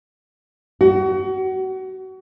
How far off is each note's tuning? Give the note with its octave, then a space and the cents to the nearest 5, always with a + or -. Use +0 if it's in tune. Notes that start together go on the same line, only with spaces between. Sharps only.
F#4 +30